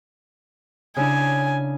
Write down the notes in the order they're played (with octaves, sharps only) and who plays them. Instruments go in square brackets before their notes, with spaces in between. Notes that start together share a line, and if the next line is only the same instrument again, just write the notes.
[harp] C#3 D4 E4 [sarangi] G#5